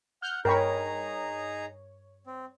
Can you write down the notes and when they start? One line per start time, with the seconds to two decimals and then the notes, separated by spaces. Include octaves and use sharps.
0.22 F#5 F6 G6
0.45 G2 D#4 G#4 A#4 C#5 G5 A#5 B5
2.26 C4